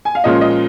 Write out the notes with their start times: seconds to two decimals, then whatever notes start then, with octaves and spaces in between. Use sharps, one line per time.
0.05 G#5
0.15 F5
0.24 A#2 F3 G#3 C#4 F4 D#5
0.41 D#5